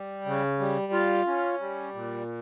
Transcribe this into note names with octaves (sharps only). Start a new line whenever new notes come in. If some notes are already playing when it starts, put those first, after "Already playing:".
Already playing: G3
C#3
G3
F4
C#4
G3
A#2